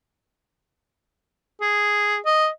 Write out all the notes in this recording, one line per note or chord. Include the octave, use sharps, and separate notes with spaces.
G#4
D#5